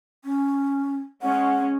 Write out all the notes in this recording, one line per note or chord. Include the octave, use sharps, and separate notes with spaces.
C#4
G#3 C#4 F#5